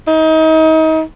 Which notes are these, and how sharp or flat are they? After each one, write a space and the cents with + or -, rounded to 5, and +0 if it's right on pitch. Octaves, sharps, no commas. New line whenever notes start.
D#4 +30